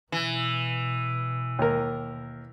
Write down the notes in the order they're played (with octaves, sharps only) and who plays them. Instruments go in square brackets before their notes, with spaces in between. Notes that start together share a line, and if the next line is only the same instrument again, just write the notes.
[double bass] B2 [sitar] E3
[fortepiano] D#2 A#4